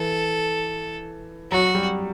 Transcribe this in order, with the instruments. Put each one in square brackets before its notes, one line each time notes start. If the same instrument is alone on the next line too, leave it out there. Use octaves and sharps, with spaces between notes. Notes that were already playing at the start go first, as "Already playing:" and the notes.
Already playing: [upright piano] E3 [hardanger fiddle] A4
[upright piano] F#3 [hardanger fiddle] F#4
[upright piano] G3